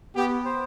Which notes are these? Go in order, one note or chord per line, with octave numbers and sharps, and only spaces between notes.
B3 G4
C5